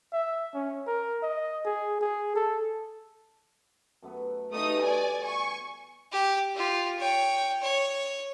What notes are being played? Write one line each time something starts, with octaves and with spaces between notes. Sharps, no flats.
E5
C#4
A#4
D#5
G#4
G#4
A4
F#2 A3 B3
E3 G3 A3 D#4 D#6
D5 G#5
G#5 C#6
G4
F4 G4
C#5 G5
C#5